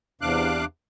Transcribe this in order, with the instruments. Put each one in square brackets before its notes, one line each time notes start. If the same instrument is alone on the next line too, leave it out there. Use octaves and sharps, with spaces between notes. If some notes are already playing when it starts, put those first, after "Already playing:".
[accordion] E2 C3 D4 F5 D6 F#6